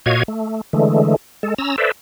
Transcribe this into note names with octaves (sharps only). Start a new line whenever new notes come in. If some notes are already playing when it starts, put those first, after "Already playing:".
A#2 F#4 C#5 D#5 F5 G#6
A3
D3 E3 G#3 A3
G#3 A4
C#4 A#5 E6
A4 B4 C5 D5 E5